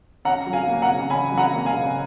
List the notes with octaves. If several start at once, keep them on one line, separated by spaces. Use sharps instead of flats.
C#4 F#5 A#5
F#3
F5 G#5
A#3
F#5 A#5
C#3
C#4 G#5 B5
F#3
F#5 A#5
A#3
F5 G#5
C#3